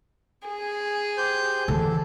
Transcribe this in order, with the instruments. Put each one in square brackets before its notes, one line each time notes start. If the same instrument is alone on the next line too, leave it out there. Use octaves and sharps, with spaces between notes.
[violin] G#4
[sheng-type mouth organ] G4 C5 G6
[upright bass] D3 E3 [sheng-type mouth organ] A4